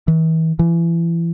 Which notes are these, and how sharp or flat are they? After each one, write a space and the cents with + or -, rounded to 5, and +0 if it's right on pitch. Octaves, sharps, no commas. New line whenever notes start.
E3 -40
E3 +30